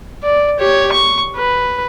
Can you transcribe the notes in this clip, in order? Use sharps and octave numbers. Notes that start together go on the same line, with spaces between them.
D5
G4 C#5
C#6
B4